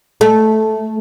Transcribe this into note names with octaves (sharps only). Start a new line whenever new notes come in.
A3